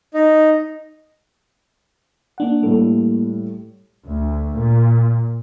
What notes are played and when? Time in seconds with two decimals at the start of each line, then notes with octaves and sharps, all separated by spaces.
0.14 D#4
2.38 A#3 D4 F#5
2.63 A2 G3 A#3 A4
4.05 D2
4.54 A#2